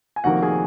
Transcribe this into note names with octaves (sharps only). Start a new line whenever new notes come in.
G#5
F1 F2 D#3 A#3 F#4 F#5
G#4 G#5